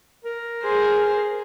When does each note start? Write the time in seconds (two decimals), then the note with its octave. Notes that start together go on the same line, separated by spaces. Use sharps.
0.24 A#4
0.63 G#4 C5